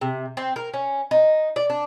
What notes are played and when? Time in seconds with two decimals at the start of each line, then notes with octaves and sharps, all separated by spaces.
0.01 C3
0.37 C4
0.56 A#4
0.74 C#4
1.11 D#4
1.56 D5
1.70 D4